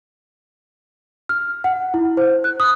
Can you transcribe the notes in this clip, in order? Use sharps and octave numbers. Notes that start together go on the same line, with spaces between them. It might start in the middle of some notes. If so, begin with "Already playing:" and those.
F6
F#5
E4
C5
F#6
D#6